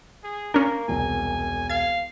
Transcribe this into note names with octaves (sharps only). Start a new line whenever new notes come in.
G#4
A#3 C#4 D4 A#4
E1 C2 G#5
F5 G#6